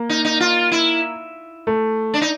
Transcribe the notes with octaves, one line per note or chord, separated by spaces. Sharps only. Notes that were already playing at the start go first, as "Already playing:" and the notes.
Already playing: A#3
D#4
D#4
F4
E4
A3
D4
D#4